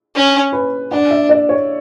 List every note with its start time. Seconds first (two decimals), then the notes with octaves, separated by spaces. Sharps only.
0.15 C#4
0.53 B4
0.91 D4 F#5
1.11 E5
1.29 D5
1.49 C#5